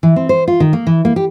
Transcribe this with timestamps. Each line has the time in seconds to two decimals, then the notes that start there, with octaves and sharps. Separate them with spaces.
0.03 E3
0.16 C4
0.29 C5
0.48 F4
0.60 D#3
0.73 A#3
0.87 E3
1.05 A#3
1.16 G4